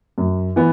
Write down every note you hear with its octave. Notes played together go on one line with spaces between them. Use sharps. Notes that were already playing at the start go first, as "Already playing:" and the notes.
F#2
E3 B3